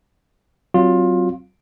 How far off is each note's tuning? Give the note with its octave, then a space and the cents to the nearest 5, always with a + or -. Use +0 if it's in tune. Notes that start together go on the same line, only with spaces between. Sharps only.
F#3 +20 C4 +0 F4 +20